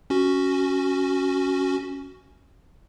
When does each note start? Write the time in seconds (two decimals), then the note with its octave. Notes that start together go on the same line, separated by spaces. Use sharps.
0.10 C#4 F#4